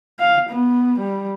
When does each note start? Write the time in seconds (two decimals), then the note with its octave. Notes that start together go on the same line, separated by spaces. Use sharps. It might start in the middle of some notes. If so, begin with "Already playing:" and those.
0.19 F5
0.50 B3
0.99 G3